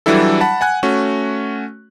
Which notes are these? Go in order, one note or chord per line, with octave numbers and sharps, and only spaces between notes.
E3 F#3 G3 D4 E4 A4
F#5 A5 B5
F#5 G#5 F#6
A3 C#4 F#4